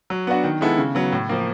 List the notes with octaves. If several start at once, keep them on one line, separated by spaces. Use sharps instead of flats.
F#3
B3 D4 F#4
D#3
G#3 B3 E4 A4
C#3
F#3 B3
A2
F3 A#3